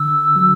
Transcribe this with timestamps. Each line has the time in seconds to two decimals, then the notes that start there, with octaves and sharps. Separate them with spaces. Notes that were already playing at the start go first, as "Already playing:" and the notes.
Already playing: D3 E6
0.36 F#3